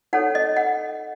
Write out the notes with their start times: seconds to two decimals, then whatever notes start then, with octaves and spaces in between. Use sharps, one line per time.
0.13 D#4 A4 C#5 F#5
0.35 D#5
0.57 F#5